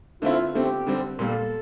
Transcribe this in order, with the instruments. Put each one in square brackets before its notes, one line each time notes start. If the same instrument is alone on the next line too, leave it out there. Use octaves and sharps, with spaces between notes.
[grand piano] D3 A3 C4 E4 [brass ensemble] F4
[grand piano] D3 A3 C4 [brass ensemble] G4
[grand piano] D3 G3 C4
[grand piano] A#2 G3 A#3 [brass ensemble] A4